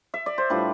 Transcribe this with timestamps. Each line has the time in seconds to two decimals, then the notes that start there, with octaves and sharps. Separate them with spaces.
0.14 E5
0.26 D5
0.38 C5
0.50 A2 G3 D4 F4 B4